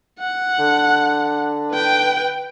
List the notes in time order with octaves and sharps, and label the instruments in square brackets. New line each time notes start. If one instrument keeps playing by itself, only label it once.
[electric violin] F#5
[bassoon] D3
[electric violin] B4 G5